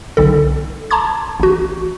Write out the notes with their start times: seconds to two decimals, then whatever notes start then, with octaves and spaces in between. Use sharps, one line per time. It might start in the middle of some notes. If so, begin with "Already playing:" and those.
0.17 B1 D3 A4
0.91 A5 A#5 C6 D6 G#6
1.40 A1 F#4